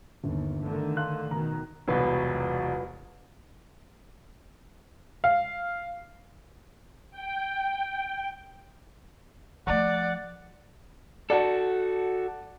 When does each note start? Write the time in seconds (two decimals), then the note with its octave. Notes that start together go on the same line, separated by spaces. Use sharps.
0.24 G1 D#2
0.61 D3 D#3 A3
0.97 F5 C6 F#6
1.31 B2 D#3 A#5
1.88 E1 C2 B2 F#3 F4 B4
5.24 F5
7.11 G5
9.67 F3 A3 D5 F#5
11.30 F#4 A4 D5 F#5 A5